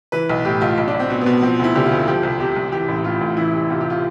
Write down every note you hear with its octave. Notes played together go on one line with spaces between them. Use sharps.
E3 B4
B1
A2 G4
B1 F4
B1
D4
B1
C4
B2
B2 B3
F3 C4
D2 E4
D3 G4
F4
D2
F3 G4
C2
C3 G4
C2
E3 G4
A1
A2 F4
A1
E3 E4
C2
C3 F4
G4
F4